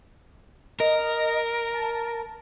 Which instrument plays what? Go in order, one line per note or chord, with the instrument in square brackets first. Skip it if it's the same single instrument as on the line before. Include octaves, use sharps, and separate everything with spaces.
[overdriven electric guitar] A#4 [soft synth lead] D#5
[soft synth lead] A5